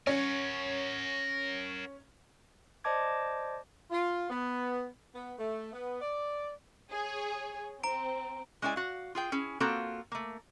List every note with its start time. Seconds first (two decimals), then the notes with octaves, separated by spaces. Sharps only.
0.07 C#4 A#4 F#5
2.84 C5 D5 D#5 A5 D6 G#6
3.90 F4
4.30 B3
5.14 B3
5.39 A3
5.73 B3
6.01 D5
6.92 G#4 C#5
7.83 C4 A#5 D7
8.62 G#3 C#4 E4 D5 G#5
8.76 F#4 F5
9.15 F4 G#4 G5
9.32 C#4 E4 G#4
9.60 A#3 C4 F4 F#4 A4
10.12 A3 A#3